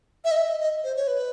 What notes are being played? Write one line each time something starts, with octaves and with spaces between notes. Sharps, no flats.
E5
D#5
E5
D#5
D#5
C5
C#5
B4